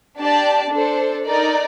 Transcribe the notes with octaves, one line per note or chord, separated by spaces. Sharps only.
D4 G4 D5 A5
D4 A4 C5
D#4 A#4 D5